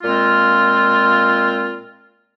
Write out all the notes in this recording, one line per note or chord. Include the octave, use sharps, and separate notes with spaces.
A#2 G#3 C4 F4